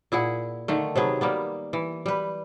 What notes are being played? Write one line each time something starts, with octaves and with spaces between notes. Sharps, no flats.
A#2 E4 G#4 F#5
D3 D#3 A3
C3 F#3 B3 G#4
G3 A#3 B3
E3
G3 B4